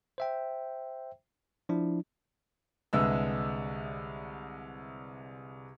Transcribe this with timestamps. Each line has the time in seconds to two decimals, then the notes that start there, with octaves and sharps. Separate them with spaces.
0.18 C5 E5 G5
1.69 F3 D4 E4
2.93 C2 D3 G#3 B4 E5 E6